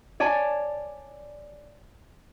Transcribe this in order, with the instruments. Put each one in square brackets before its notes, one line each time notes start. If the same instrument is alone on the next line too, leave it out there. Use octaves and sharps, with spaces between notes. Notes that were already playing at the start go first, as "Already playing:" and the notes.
[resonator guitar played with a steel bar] C#5 D5 G#5 A5